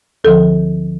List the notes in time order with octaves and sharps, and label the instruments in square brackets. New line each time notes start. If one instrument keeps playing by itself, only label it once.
[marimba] D2 D3 F3 A4